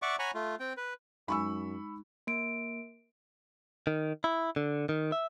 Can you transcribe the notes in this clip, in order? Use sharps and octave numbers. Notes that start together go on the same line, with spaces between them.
D5 E5 F#5 C#6 D6
C#5 F#5 G#5 A#5 B5 C#6
A3 F4
C4 G5
B4
F#2 G#3 D#4 G#5 B5 C#6 E6
A#3 D7
D#3
E4
D3
D#3
E5